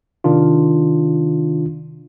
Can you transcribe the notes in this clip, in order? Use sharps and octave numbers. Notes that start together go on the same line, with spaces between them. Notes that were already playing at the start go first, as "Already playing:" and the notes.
C3 D#3 D4 F4